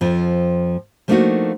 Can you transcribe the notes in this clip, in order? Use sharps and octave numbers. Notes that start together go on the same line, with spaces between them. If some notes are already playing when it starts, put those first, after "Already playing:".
F2 F3
F3 A3 A#3 D4 D#4 F#4